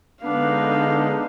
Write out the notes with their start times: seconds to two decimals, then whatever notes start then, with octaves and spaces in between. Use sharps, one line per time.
0.23 D3 G#3 B3 D4 D#4 F5